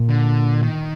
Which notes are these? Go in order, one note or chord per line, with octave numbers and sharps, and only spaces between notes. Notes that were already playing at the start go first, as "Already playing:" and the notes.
Already playing: A#2
D3
D#3